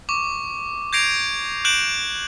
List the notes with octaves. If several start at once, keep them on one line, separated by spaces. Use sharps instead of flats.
C#6 D6
G6 G#6 A#6 C7 D7 F7
F#6 G6 D7 E7 F#7